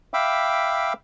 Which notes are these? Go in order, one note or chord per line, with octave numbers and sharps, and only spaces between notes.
E5 F5 G5 B5 D6 E6